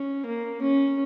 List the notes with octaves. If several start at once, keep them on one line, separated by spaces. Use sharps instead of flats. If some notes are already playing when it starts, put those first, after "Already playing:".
Already playing: C#4
A#3
C#4